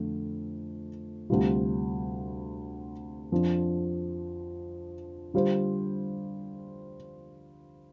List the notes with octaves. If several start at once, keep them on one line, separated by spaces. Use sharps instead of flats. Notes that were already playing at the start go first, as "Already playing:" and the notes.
Already playing: F2 D3 A3
D2 C3 G3 F4
F2 F3 D4
D3 G3 F4 C5